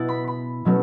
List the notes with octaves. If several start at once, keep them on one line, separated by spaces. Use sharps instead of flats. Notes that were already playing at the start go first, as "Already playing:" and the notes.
Already playing: B2 B3 E4 F#6 A6
B5
B5
B2 F#3 A3 C#4